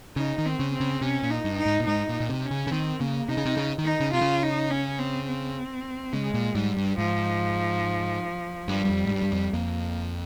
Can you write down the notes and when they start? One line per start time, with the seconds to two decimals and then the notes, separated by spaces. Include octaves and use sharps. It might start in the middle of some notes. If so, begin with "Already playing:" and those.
0.16 C#3 D#4
0.38 D#3
0.45 C4
0.59 C#3
0.74 C4
0.80 C#3
1.01 C3 C#4
1.23 A#2
1.30 D#4
1.44 G2
1.58 D#4
1.66 G#2
1.80 A#2
1.87 G#2 D#4
2.09 A#2
2.20 A#2
2.29 C3
2.43 C#4
2.51 C#3
2.67 C#3
2.71 D#3 C4
3.00 C#3 A#3
3.28 C3 D#4
3.37 C#3
3.46 C3
3.57 C#3
3.78 D#3
3.86 D#4
4.00 C#3
4.13 C3 F4
4.21 C#3
4.43 D#4
4.71 C#4
4.99 C4
5.28 C4
6.13 C#3 G#3
6.34 A#2
6.55 G#2 G3
6.77 G2
6.98 G#2 F3
8.68 G2 G3
8.85 G2
8.89 F2
9.05 G#2
9.10 G2
9.22 G2
9.32 F2
9.53 F2 A#3